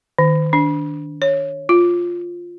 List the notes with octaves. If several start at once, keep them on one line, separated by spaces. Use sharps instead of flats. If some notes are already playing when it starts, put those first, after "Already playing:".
D#3
D4
C#5
F4